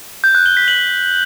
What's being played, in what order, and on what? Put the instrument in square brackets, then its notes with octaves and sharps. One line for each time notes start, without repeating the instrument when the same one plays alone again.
[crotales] G6
F#6
G7
B6
F#7